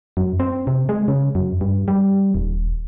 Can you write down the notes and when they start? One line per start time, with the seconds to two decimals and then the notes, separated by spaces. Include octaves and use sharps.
0.17 F#2
0.40 C4
0.67 C3
0.89 G#3
1.08 C#3
1.35 F#2
1.61 G2
1.88 G3
2.34 D#1